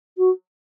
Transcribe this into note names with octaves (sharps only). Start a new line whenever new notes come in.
F#4